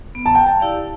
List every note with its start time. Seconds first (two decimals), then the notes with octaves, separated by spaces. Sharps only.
0.15 B3
0.26 A5
0.35 G5
0.46 A5
0.60 E4 G4 D5 F5